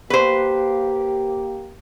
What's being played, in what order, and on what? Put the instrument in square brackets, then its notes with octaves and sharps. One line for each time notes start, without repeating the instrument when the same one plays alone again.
[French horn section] A#3 G4 [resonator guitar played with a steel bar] B4 C5